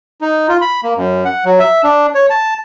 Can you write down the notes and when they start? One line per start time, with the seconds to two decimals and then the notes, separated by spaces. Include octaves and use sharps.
0.21 D#4
0.48 F4
0.61 B5
0.83 A#3
0.97 F#2
1.25 F#5
1.45 F#3
1.59 E5
1.84 D4
2.15 C#5
2.30 A5